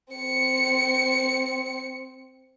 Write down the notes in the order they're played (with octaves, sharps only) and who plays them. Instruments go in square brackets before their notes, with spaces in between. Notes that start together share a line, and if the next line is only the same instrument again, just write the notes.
[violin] C4 C#7